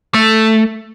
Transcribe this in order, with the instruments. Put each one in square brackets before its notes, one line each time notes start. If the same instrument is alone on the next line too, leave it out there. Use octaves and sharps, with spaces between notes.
[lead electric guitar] A3